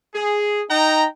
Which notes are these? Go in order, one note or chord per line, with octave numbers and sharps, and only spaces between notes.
G#4
D#4 G5 A#5